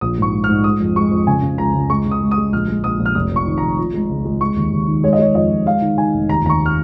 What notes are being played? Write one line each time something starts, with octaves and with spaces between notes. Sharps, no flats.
A#1 D#6
G#2 C#6
G#3
F6
G#2
G#3 D#6
F2
G#3 C#6
F2
C#3 G#5
C#3
C#2 A#5
C#2
G#3 C#6
C#3
D#6
G#3
D#6
G#3
A#1 F6
G#3
A#1 D#6
A#1
F6
F1 D#6
F2 C#6
D#3
F1 A#5
F3
G#3
C#2
G#3
G#3 C#6
D#2
D#2
D#3
G#3 C#5
D#5
G#3 C#5
F2 D#5
F2
G#3 F5
D#3
D#3 G#5
F1
D#2 A#5
D#2 A#5
C#6
F6